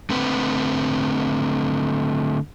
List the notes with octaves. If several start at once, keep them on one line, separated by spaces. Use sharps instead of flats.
D3 A3 C4 B4